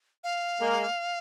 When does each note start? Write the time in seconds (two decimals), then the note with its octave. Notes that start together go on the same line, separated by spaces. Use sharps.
0.24 F5
0.61 G#3 A#3